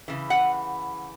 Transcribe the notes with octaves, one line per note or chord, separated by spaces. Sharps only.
C#3 E3
F#5